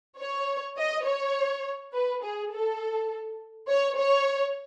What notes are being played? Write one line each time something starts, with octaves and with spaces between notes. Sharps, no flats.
C#5
D#5
C#5
B4
G#4
A4
C#5
C#5